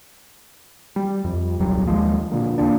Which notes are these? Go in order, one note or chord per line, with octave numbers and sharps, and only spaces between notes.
G3
F2
D1 B1 F#3 G3
D#2 F3 G#3
A#2 D3 A#3
E2 G#2 A#3 D4